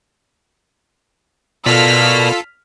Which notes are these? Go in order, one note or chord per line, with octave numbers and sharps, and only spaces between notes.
B2 F4 A4 A#4 D5 F6 B6